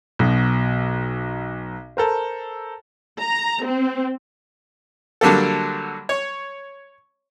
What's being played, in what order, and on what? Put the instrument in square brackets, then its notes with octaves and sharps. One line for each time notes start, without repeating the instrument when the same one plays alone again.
[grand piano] B1 B2
A4 A#4 C5
[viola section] A#5
C4
[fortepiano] D3 F#3 G3 A#3 A4
C#5 C#6